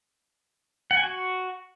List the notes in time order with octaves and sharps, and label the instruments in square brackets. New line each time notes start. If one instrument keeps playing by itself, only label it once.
[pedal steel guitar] F#5
G#5
F#4